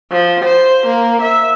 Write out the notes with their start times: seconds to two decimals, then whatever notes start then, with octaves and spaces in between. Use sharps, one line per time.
0.11 F3
0.44 C5
0.86 A#3
1.22 E5